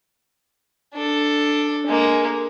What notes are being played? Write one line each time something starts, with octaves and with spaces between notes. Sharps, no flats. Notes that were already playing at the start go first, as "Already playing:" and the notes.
D4 A4
G#3 A#3